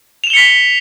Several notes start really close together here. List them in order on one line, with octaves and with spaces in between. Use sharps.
F7 E7 G7 C#7 B6